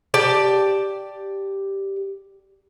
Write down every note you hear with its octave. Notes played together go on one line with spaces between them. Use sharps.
G4 D5 A5